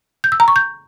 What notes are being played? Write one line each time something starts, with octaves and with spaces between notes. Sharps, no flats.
G6
E6
A#5
C#6
G6